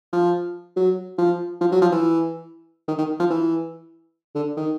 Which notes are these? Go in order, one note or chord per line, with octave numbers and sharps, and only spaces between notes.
F3
F#3
F3
F3
F#3
F3
E3
D#3
D#3
F3
E3
D3
D#3